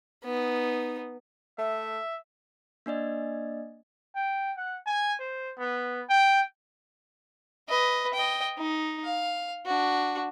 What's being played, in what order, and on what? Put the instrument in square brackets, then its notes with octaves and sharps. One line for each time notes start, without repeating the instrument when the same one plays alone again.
[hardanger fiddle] B3 D#4
[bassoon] A3 [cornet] E5
[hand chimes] A#3 D4 D5 D#5
[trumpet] G5
F#5
G#5
C5
B3
G5
[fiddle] B4 D#5
D#5 G5
D#4
F5
D4 F#4